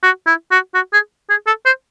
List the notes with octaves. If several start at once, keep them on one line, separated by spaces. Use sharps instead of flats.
F#4
E4
F#4
F#4
G#4
G#4
A4
C5